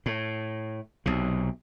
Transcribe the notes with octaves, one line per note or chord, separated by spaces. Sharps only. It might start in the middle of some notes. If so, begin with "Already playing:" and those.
A2
B1 C3